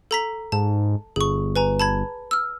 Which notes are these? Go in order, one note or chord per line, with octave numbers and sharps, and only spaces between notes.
A4 A#5 B6
G#2 A5
G1 G#4 C#6
B4 G#5 A#5
A5 B5 G#6
E6 F6